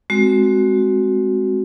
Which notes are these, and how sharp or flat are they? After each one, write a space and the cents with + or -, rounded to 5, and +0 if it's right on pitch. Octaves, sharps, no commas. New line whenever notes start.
G#3 +5 C4 +0 F#4 +0